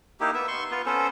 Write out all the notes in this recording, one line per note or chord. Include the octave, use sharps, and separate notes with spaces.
A#3 D#4 E4 G4
B3 E5
C6 C#6
B3 F4
B3 C#4 A4 C5